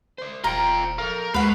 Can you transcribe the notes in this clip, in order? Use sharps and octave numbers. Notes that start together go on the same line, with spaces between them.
C5 D5
D#1 F4 G5 A#5
A4 A#4 F5
D#2 G#3 A3 B4 F5 F#5